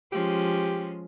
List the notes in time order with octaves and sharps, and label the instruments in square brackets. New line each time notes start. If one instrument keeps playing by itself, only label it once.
[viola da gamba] F3 G#3 C#4 [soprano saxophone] G4